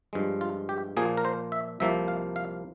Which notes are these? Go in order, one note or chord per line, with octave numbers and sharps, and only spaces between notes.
G2 F3 G#3
F4
G4
A#2 F3 A#3 G#4
A#4
C5
E5
C2 C3 F3 A#3 E5
F5
F5